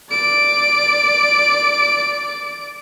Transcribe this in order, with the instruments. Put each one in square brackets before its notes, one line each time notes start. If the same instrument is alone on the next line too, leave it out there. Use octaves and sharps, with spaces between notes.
[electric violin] D5 D7